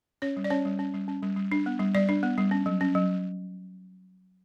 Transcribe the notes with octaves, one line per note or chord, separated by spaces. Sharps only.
C#4 C#5
G3
D5
C#4 C#5
G3
C#4
G3
C#4
G3
G3
D4
B3
G3
G3 D5
D4
B3
G3
C#4
F#3
C#4
F#3